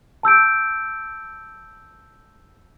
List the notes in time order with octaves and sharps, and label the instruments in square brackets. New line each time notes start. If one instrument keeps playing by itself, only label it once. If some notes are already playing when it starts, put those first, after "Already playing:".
[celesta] A5 E6 G6 D7